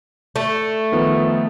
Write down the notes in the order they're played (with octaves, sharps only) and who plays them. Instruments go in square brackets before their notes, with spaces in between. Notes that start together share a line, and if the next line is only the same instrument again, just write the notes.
[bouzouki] A3
[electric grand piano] D#3 F3 B3